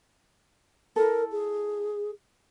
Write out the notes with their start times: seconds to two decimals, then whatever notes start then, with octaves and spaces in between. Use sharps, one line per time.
0.96 E4 A4 A#4
1.32 G#4